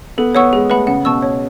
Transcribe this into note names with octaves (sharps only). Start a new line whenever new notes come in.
B3 A4
B3 C#5 F#5 C#6 E6
G#3 G#4
A3 B4 F#5 B5
C#3 F#5
B2 A5 C#6 E6
C#5